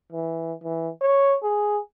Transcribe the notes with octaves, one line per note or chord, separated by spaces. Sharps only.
E3
E3
C#5
G#4